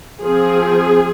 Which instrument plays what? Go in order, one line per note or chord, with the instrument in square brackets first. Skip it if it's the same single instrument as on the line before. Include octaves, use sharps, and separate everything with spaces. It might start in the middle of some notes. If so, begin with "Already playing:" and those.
[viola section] F3 C4 G#4